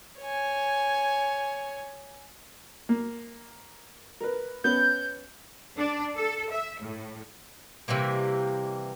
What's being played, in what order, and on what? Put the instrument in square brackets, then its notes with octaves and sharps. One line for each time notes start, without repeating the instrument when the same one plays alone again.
[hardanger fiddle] C#5 G#5
[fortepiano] A#3
A#4 B4
[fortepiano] B3 C#4 B4 [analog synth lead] G6
[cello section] D4
A4
E5
A2
[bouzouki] C3 E3 G3 A#3